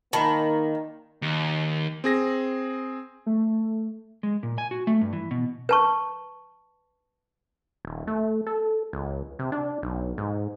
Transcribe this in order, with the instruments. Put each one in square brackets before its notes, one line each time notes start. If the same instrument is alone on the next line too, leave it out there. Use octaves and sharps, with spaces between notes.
[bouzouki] D#3 [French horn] A#3 [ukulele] A5 B5
[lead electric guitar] D#2
[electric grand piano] C4 G#4 A#6
[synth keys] A3
[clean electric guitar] G#3
A#2
G#5
F#4
A3
G2
E3
B2
[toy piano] B4 A5 C#6
[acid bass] D#1
A3
A4
C#2
C3
D4
B1
G#2